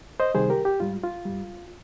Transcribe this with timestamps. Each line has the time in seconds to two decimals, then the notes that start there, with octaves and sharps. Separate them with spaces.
0.20 C5 D#5
0.34 C2 C3 D#3 G3 G#4 C5
0.50 G4 A#4
0.65 G4
0.80 G#2 G3 F4
1.04 F4
1.25 G2 G3